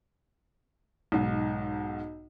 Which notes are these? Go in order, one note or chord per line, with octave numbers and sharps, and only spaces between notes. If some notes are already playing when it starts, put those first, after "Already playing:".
B1 G#2